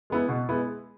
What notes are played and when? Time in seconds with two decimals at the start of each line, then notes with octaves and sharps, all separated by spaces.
0.10 G#3 B3 E4
0.28 B2
0.49 G#3 B3 E4